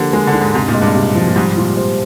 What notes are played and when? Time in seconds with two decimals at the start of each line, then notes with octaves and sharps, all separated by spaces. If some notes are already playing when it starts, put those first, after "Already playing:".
Already playing: D3 F3 A#3 G4
0.13 G#3 A#4
0.27 D3
0.34 D4
0.40 G#2
0.54 G#2 C3
0.68 A#2
0.74 G#3
0.82 G2
0.95 C3
1.15 F3
1.27 A#2
1.36 G#2 G3
1.57 A#2 F4
1.77 C5